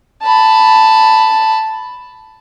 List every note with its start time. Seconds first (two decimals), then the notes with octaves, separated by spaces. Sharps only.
0.23 A5 B5